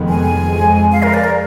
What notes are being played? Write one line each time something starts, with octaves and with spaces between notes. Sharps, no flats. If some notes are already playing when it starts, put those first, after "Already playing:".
Already playing: F1 F2 D#3 G#3 B3
G#5
F2 F3 G#3
F5
A#4
D5
A#4